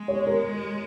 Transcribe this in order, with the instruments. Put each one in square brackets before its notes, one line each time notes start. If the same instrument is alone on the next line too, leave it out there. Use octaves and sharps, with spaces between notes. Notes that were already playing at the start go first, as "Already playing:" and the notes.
Already playing: [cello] G#3
[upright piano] C#5
A#4